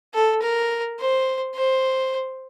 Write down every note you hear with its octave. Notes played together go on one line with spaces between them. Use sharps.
A4
A#4
C5
C5